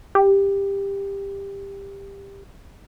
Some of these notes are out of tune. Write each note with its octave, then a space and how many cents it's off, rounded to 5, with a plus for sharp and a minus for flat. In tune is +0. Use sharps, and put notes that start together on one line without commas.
G4 +15